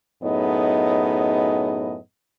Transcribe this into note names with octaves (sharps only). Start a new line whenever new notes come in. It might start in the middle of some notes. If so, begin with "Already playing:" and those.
F#2 A2 B3 D#4 G#4 D#5